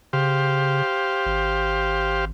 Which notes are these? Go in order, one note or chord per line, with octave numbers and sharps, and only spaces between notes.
C#3 G4 C5 F5
G#1